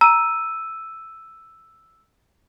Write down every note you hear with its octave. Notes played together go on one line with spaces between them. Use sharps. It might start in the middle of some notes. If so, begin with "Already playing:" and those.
A#5 E6 D#7